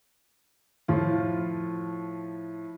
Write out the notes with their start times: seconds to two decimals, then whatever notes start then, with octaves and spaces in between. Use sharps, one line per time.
0.88 A2 F3 F4